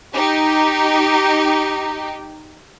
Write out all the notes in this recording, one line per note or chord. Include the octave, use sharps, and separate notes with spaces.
D#4 G4